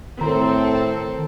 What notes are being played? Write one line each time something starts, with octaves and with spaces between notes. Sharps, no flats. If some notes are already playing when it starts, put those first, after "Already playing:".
A2 D#3 C4 A4 A#5